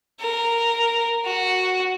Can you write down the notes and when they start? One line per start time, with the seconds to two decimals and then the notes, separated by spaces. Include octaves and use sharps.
0.20 A#4
1.25 F#4